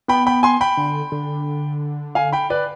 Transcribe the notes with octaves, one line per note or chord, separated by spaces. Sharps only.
B3 G5 B5
G5 B5
G#5 C6
G5 B5
D3
D3
F5 G#5
G5 B5
B4 D5